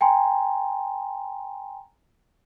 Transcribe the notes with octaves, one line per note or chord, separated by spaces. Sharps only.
G5 G#5 A#5 C6